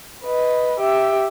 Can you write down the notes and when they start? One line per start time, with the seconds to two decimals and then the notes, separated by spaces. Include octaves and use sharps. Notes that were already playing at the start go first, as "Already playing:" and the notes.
0.24 B4 D#5
0.80 G4 E5